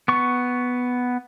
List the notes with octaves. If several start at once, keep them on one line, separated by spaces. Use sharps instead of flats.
B3 C#6